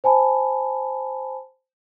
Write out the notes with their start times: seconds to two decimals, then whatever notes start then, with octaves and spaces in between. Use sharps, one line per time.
0.04 C5 G#5 A5 B5